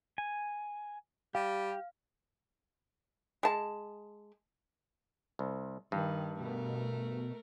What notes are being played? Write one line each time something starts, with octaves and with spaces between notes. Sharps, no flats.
G#5
G3 G4 F5
G#3 A5
C2
G2 D#3
B2 A3 A#4